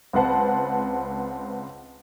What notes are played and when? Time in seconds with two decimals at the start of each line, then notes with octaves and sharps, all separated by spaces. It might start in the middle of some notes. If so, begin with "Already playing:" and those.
0.13 C#2 C4 B4 F#5 A5